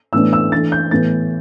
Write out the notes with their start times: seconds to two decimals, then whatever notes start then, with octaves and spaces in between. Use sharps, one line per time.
0.13 A2 E3 B3 D4 E6
0.33 E6
0.52 E3 A3 D4 A6
0.72 G6
0.91 A2 E3 B3 A6